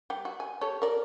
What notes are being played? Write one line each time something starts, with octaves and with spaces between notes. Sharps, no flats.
G3 G4
F#4
G#5
G4 A4 C#5
A#4 D5